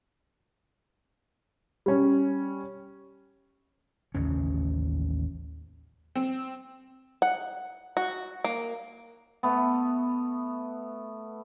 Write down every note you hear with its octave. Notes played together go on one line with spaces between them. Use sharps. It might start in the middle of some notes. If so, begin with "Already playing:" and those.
G3 C#4
A1 D#2 C#3 C#4
C4
F#5
F#4
A#3
A3 B3